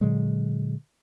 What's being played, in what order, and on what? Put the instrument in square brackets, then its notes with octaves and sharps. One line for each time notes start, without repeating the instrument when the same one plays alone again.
[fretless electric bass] A#2 D3 F#3 G#3